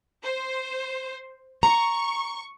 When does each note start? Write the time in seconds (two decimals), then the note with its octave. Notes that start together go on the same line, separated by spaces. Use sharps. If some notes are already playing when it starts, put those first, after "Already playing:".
0.23 C5
1.63 A#5 C#6